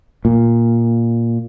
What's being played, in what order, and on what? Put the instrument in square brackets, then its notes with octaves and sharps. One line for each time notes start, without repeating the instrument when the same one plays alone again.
[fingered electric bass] A#2